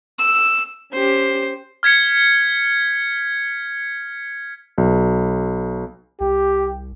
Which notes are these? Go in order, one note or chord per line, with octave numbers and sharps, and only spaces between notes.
E6
C#4 G4 C5
F6 G#6 B6 C#7
B1
C2 G4